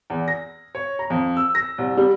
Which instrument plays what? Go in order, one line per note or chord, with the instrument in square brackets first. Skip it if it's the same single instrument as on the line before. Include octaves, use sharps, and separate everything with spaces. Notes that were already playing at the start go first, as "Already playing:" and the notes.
[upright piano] E2
A#6
C#5
A#5
F2
E6
A#6
C2
G3